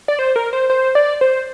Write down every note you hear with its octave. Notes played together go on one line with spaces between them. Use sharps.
D5
C5
A#4
C5
C5
D5
C5